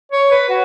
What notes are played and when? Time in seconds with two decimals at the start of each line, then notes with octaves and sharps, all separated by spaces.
0.12 C#5
0.31 B4
0.49 F#4